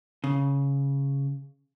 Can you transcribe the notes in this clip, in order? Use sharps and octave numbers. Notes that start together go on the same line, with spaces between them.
C#3